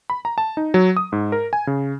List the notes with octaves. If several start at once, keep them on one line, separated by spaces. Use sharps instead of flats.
B5
A#5
A5
D#4
F#3
D#6
G#2
A#4
G#5
C#3